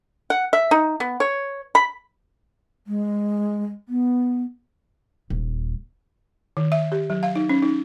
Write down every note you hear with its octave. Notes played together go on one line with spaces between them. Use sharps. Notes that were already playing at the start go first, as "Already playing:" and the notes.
F#5
E5
D#4
B3
C#5
B5
G#3
B3
D#1
D#3
E5
G4
F#3
F5
D#4
C#4
D#4